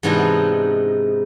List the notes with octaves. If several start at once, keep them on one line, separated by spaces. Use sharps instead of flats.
G#2 C3 E3 B3 D4 D#4